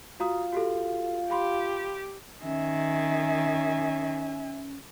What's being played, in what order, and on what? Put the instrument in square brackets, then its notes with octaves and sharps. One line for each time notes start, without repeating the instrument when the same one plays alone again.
[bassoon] F4 [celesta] F#4 A#5 D#6
[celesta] F#4 G4 A4
[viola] G4 [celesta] F5 B5 C6
[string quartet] D#3 [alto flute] C#4 [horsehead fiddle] E5 G#5